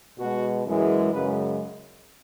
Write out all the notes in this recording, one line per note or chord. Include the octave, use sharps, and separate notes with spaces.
B2 G#3 F#4
F#2 E3 G#3
F#2 C#3 G#3 B4